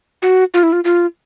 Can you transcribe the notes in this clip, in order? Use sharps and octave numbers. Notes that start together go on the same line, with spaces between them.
F#4
F4
E4
F4
F4